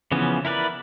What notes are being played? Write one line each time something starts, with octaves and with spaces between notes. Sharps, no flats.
C#3 E3 F3 B3 C#4
E4 A#4 B4 D5